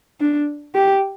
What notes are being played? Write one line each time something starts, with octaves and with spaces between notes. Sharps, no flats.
D4
G4